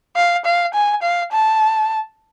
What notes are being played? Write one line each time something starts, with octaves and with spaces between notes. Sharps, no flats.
F5
F5
G#5
F5
A5